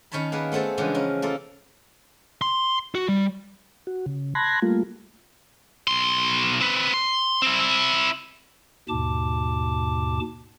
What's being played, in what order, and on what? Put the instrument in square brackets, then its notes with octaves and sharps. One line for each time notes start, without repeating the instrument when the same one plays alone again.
[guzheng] D#3 C#4 C#5 A5 B5
A#3 B3 G#4 B4
A3 B3 C4 G#4 A5
C#3 E3 F3 G#3 B3 D4
C#4 A#4
A#3 F4 A4
[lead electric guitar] C6
F#4
G3
[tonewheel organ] F#4
C#3
A5 B5 C6 F#6 G#6 A#6
G3 A3 A#3 F4
[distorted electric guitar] B1 C6
C4 B4
C6
C4 E4
[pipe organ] D#2 G#2 B2 A5 D6